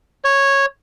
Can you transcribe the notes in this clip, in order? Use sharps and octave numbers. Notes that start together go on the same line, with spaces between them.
C#5